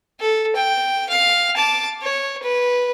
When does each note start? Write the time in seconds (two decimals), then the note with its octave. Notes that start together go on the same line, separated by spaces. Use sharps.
0.20 A4
0.56 G5
1.09 F5
1.56 A5 D6
2.02 C#5
2.43 B4